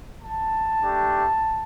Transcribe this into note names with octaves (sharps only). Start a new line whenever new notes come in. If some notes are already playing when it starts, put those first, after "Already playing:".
A5
A3 D4 G4